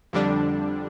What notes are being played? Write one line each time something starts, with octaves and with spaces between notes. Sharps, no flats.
F2 D3 G3 D4